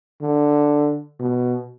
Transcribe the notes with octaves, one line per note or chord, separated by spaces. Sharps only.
D3
B2